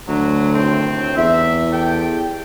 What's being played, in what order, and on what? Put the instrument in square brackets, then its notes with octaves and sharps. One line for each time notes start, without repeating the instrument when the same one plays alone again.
[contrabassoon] D2 [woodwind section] F#3
[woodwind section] D#2 A2 C4
[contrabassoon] E2 [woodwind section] E5
[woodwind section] G4 A4 G5